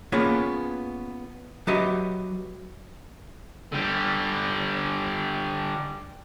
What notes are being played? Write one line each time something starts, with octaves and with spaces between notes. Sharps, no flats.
A#3 B3 C#4 F4 G#4 B4
F#3 G4 B4 D#5 E5
D3 G3